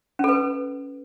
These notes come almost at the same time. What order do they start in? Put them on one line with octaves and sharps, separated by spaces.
C#4 A4 B4